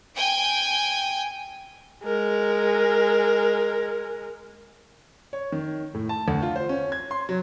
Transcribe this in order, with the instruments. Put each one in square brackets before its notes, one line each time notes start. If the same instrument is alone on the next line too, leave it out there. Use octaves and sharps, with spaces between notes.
[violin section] G5 G#5
[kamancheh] G#3 A#4
[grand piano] C#5
D#3
A2
A5
D2
F4
C5
C#4
G#6
C6
F#3